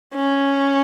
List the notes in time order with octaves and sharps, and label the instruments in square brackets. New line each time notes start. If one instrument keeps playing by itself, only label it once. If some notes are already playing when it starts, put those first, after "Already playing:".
[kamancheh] C#4